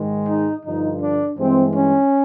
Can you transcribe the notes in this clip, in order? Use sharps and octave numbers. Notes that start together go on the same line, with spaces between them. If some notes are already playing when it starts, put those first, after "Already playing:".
Already playing: G#2 D#3 G#3
D#4
G2 D3 F3 D#4
D4
G2 E3 G#3 C4
C#4